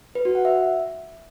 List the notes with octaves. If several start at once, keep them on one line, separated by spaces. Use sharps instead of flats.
B4
F#4
F#5
E5